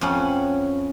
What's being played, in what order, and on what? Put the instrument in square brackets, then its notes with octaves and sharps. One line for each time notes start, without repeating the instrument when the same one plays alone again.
[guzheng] F2 C#4 F#5